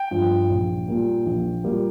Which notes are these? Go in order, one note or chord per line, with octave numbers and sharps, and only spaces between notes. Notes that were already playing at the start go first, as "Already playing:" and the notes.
Already playing: G5
G2 F3
A#1
A#2 G3 A#3
A#1
A#2 G3 A#3